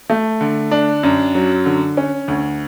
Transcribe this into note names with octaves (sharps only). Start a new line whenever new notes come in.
A3
D3
D4
F#2
F#3
D3
C#4
D2